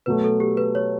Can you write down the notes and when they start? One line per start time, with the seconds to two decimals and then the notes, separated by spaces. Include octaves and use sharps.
0.06 B2 F#3 A3 B4
0.24 A4
0.40 G4
0.57 B4
0.75 C#5